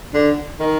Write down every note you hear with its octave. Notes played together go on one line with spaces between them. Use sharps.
D3
D#3